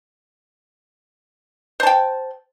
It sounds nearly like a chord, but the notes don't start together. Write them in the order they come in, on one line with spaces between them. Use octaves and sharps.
C5 A5 G5